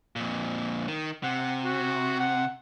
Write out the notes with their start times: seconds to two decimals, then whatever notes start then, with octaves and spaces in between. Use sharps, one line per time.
0.16 F2 A#2
0.88 D#3
1.23 C3 F#5
1.65 F#4
2.19 F#5